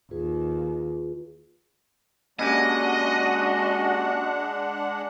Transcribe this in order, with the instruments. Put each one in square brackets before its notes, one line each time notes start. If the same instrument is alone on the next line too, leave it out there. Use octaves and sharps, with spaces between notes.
[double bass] D#2 [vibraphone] F4 G#4 B4
[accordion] G#3 D4 F#5 [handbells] A#3 C#4 G4 [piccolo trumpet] F#4 [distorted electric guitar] D#5